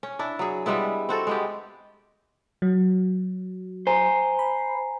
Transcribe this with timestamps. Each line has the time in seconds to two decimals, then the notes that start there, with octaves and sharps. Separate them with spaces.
0.03 C#4
0.19 D4 E4
0.39 F#3 G#4
0.66 G3 G#3 B3 E4
1.09 C4 F#4 A4
1.27 G#3 B3 G4
2.62 F#3
3.87 C5 G#5 A#5
4.39 B5